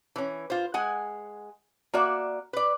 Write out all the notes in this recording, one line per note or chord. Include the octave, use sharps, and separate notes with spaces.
E3 C#4
F4 C5
G#3 F#5 G#5
A#3 F#4 D5 E5
B4 D5